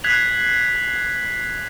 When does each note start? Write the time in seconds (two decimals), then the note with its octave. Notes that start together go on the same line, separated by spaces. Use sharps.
0.04 F#6 G#6 B6 C7 F7 F#7